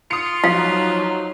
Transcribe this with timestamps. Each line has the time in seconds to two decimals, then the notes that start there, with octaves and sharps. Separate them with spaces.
0.11 F4 D#6 C#7
0.44 F3 F#3 D#4 F5